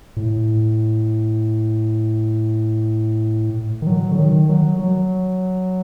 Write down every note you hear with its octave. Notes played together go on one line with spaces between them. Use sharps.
A2
D#3
F#3
D3
D#3
F#3
F#3